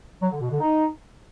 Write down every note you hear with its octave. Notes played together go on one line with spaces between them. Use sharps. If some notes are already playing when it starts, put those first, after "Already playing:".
F#3
D3
B2
D3
D#4